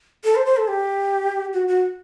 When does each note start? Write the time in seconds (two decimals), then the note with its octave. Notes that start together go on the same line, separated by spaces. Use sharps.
0.24 A4
0.35 C5
0.46 C5
0.57 A4
0.68 G4
1.53 F#4
1.68 F#4